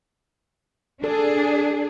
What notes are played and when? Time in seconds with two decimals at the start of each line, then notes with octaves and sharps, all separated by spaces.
1.04 D4 G#4 A4